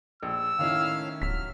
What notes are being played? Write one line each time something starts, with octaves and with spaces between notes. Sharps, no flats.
A#1 E6
A2 D#3 C#4 E4 F5 F6
D1 F#3 F6 B6